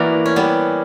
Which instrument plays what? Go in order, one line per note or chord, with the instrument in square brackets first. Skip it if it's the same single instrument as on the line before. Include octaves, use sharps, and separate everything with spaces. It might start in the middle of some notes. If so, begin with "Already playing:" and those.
Already playing: [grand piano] E3 A#3 E4 B4 D5 [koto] F#4 A#4
[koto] C#4
G3 B3